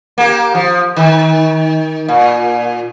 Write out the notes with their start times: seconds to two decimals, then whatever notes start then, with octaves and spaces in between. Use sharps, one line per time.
0.18 A#3 G4
0.55 F3
0.96 D#3
2.08 A#2